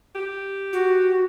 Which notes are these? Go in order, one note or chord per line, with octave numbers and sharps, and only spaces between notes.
G4
F#4